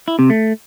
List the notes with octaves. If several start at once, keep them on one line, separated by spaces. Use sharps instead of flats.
E4
C3
A3